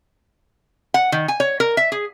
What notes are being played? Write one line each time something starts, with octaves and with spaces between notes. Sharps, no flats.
F#5
D#3
G#5
C#5
A#4
E5
G#4